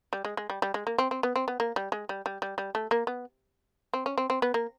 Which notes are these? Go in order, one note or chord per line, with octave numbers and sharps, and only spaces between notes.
G3
G#3
G#3
G3
G3
G#3
A#3
C4
C4
B3
C4
B3
A#3
G3
G#3
G3
G3
G3
G3
A3
A#3
B3
C4
C#4
C4
C4
B3
A#3